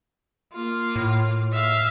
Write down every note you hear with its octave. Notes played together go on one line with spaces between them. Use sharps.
A#3 F4
A2
E5 F5